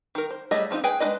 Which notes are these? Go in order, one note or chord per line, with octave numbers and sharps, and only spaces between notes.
D#3 A#4
C5
G3 A3 G#4 C#5 D#5
F3 C4 D#4 F4
G#4 B4 G5 G#5
G#3 D4 D#4 B4 D#5